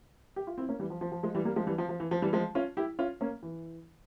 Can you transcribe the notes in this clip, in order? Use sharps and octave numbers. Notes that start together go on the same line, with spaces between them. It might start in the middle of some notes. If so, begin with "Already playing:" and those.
G4
F4
C4 E4
A#3 C#4
E3 G3
F3
F3
F3
F3 G#3
E3 G3
G3 A#3
F3 G#3
E3 G3
F3
F3
E3
F3
E3 G3
F3 G#3
C#4 F4
E4 G4
C#4 F4
A#3 C#4
E3